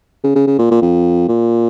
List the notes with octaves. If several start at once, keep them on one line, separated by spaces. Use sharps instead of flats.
C#3
C#3
C#3
A#2
A#2
F2
A#2